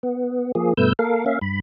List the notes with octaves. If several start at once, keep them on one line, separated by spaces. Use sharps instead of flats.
B3
F3 A#3 G#4
G2 B2 A3 B4 E6 G6
A#3 A4 A#4 F5
A#3 C#4 E5 F5
G2 B5